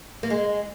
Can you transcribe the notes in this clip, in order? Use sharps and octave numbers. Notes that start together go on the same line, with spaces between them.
A#3
G#3